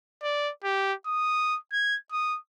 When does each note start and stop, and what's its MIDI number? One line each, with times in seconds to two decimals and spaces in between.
0.23 0.51 74
0.64 0.93 67
1.06 1.57 87
1.72 1.97 92
2.12 2.38 87